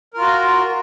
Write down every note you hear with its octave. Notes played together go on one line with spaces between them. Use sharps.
F4 F#4 A#4